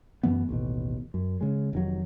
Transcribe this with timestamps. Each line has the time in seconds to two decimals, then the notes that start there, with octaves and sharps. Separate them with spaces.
0.23 F#2 E3 A3 B3
0.49 A1 D#2 B2
1.14 F#2
1.41 C#3 G#3
1.73 F1 D#3 F#3